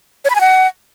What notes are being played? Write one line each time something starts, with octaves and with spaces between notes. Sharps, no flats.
C#5
B5
G#5
F#5